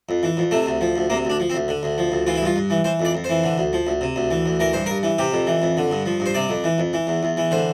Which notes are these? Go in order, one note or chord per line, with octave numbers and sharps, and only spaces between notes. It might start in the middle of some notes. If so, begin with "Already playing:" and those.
F2
E3
F2
C3 A3
D2
F3
D2
C3 A#3
D2 D4
F3
C4
D2
D3
D2
F3
D2
E3 F4
E4
G2 F4
G2
E3
E3 C5
F2
D5
F2
C5
E3
D3
D2
F3
D2
C3
D2
E3
D2
E3 A#4
G2 C5
G2 A#4
E3
C3 G4
F2
E3
F2
D3
G2
F3
G2
C5
C3 D5
F2
E3
F2
E3
E2
E2
E3
D3 C5